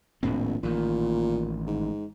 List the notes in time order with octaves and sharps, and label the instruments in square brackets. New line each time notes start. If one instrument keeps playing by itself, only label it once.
[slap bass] D#1 A2 C4 [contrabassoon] A#1
[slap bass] A1 D#3 [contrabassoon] A#2
[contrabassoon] G#2